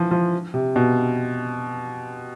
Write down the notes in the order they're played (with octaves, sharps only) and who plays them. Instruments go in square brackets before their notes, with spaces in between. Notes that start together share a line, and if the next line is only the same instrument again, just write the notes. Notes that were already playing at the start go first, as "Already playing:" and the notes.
Already playing: [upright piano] E3 F3
F3
C3
B2